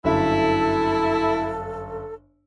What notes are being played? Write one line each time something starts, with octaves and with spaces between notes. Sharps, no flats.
G1 F#2 E4 A4 E5